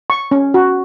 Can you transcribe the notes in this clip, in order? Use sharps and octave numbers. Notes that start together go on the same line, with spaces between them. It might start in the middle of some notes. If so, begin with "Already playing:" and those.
C#6
C#4
F#4